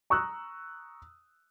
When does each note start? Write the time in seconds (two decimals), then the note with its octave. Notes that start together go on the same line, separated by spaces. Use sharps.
0.10 A#5 C#6 D#6 E6 F#6